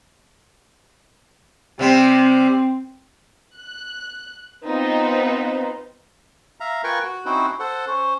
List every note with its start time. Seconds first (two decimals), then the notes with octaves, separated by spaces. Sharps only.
1.79 C3 G3 C4
3.56 F#6
4.66 B3 C4 D#4 F4 B4 C5
6.60 E5 F5 A#5
6.84 F4 A#4 B4 G5 G#5 C#6
7.04 F#4
7.26 C4 C#4 D#4 E4 F#4 C5
7.60 A4 C5 F#5
7.87 C#4 C5